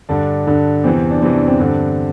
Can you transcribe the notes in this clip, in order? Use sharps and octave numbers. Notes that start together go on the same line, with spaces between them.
G2 D3 D4
G2 D3
E2 C3 E3 C4
D4
E2 C3 E3 C4
D4
C4
G2 D3